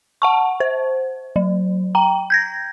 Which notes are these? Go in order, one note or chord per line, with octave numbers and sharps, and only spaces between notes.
F#5 A5 C#6
C5
F#3
G5 A#5
G6 G#6 A#6